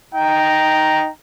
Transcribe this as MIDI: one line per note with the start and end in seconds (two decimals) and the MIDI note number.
0.14 1.09 63
0.14 1.09 79
0.14 1.09 82